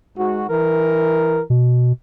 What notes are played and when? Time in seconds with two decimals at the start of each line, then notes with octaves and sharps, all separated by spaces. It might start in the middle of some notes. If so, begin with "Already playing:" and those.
0.17 G#2 F#4
0.49 E3 A#4
1.50 B2